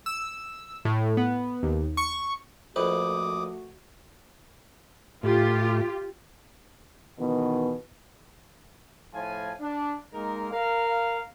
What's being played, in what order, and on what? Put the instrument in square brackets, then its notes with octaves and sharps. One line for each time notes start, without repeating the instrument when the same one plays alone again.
[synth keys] E6
A2
B3
D#2
C#6
[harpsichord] A#1 F2 B4 [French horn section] A3 F#4 [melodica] D6 D#6
[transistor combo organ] A2 [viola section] F4 G4
[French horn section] B2 D#3 E3 B3
[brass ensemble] A2 F3 F4 G#5
D4
G#3 A#3 D#4 A#4
A#4 F5